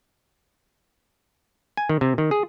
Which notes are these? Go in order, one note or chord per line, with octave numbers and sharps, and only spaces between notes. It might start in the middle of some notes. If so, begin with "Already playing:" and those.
G#5
D#3
C3
D#3
G#4